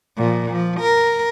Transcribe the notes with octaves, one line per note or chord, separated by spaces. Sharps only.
A#2 F3
F3
A#4